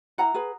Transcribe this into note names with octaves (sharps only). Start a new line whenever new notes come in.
E4 F#5 A#5
G#4 B4